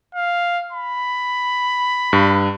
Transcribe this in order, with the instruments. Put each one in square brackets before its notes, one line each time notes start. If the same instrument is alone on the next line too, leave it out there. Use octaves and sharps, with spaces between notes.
[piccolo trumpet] F5
B5
[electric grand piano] G2